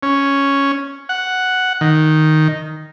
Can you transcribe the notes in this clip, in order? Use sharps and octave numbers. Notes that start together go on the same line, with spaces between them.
C#4
F#5
D#3